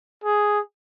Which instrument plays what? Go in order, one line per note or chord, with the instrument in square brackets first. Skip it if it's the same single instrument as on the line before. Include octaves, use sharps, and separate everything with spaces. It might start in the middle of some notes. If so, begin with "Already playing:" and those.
[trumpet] G#4